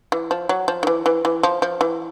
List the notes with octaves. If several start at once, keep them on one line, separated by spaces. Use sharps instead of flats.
E3
F3
F#3
F3
D#3
E3
E3
E3
F3
F3
E3